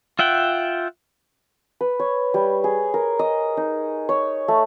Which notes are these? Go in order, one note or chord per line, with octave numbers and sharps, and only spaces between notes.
F4 E5 F#5 G5
B4
C#5
G3
G#4
A#4
D#5
D#4
C#5
A3